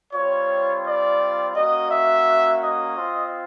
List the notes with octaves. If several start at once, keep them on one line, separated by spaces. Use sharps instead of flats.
G3 C4 F4 C#5
D5
A#3 C#4 F#4 D#5
E5
D#5
C4 F4